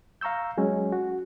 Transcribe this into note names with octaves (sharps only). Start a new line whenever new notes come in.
F5 A#5 C#6 E6 G6
F#3 G#3 C#4
F#4